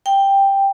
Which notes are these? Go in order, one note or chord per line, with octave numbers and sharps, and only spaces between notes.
G5